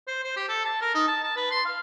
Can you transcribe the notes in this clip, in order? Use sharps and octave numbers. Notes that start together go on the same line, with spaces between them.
C5
C5
G4
A4
A5
A#4
D#4
A5
A5
B4
C6
F5